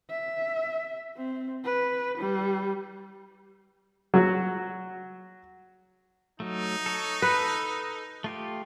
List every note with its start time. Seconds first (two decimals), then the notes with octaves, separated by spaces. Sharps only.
0.10 E5
1.17 C4
1.65 B4
2.18 G3
4.14 F#3 F#4
6.40 F#3 A3 D#4
6.86 A4 C#5
7.22 A4 B4
8.24 A3 F4 G4